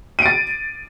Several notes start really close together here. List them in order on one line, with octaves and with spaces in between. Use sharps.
D#7 D7 A6